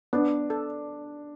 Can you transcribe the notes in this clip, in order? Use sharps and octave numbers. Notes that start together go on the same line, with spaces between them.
B3 D4
A4